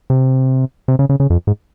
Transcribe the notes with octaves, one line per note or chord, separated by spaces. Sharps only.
C3
C3
C#3
C#3
C#3
F2
G#2